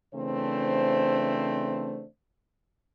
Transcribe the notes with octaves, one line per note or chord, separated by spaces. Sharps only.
C#3 E3 A3 C4 D4 C5